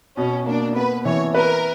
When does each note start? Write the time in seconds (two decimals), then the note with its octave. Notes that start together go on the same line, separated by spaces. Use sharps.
0.17 B2 C#4
0.46 A#3 D4
0.76 B3 B4
1.05 E3 C#5
1.34 A#4 B4